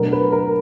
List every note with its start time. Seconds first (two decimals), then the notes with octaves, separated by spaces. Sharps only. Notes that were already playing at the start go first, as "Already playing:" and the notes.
Already playing: B2 F#3 A3 D4 A#4
0.12 B4
0.32 A#4